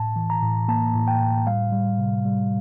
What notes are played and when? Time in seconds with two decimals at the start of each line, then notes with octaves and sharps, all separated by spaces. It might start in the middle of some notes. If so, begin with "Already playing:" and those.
Already playing: A2 A5
0.16 E3
0.30 A#5
0.42 A2
0.68 A#3 A5
0.95 A2
1.08 G5
1.20 A2
1.47 G3 F5
1.72 G3
1.98 C3
2.25 G3